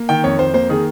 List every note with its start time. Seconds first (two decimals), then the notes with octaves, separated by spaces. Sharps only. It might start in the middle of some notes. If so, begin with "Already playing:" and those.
Already playing: A#3
0.09 D#3 G5
0.24 F2 C#5
0.39 F2 C5
0.54 A#3 C5
0.69 D#3 G#4